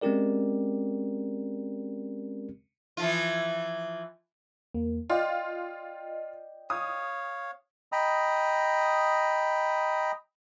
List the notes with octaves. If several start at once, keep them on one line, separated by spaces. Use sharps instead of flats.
G#3 C4 C#4 G4 A#4 D5
E3 F3 F4
E2 A#3
F4 D5 D#5 G5
C#5 F5 D#6
D#5 G5 A#5 B5 D#6